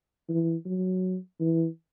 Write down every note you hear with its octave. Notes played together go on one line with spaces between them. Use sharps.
E3
F#3
E3